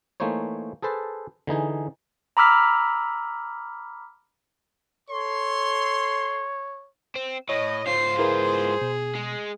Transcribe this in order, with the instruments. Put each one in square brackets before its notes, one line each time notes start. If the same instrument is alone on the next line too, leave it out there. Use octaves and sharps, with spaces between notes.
[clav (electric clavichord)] E3 A3 A#3 D#4 C5 C#5
G#4 A4 B4 C5 A5
D3 E3 D#4 G#4
[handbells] A#5 B5 D6 E6 F6 B6
[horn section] A4 C6 [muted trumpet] C#5
[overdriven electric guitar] C4
[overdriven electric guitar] A2 [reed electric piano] C#5 [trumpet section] D#5
[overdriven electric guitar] G#2 F4 [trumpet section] C5 [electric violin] C7
[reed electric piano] E4 A#4 B4 [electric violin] G#4
[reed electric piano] B2
[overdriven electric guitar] G#3